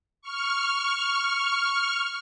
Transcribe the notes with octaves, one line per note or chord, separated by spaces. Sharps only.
C#6 F6